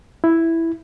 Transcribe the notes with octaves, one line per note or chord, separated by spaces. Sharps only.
E4